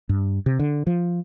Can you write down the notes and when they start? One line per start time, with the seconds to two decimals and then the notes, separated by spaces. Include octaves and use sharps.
0.09 G2
0.46 C3
0.59 D3
0.87 F3